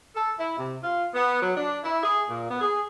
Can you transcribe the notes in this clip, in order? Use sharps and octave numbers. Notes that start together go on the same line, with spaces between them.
A4
E4
C3
F4
B3
F#3
D4
E4
G#4
A#2
B3
G#4